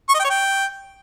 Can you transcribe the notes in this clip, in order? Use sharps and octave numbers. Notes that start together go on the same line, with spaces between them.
C#6
D#5
G5
C#5
G5